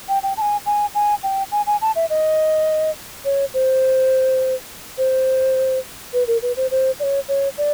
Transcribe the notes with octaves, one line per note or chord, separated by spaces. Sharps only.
G5
G5
A5
G#5
G#5
G#5
G5
G#5
G#5
A5
E5
D#5
C#5
C5
C5
B4
A#4
B4
C5
C5
D5
C#5
C#5
D5